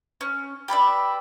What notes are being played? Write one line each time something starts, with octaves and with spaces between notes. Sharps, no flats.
C#4
G4 B4 D5 E5